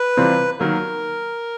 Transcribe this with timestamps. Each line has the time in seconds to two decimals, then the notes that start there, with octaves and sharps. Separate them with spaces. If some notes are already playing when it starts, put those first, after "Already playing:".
Already playing: B4
0.17 C3 E3 G3 C4 F4
0.60 D#3 F#3 A#3 A#4